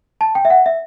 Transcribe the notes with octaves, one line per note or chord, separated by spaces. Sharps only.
A5
G5
E5
F#5
E5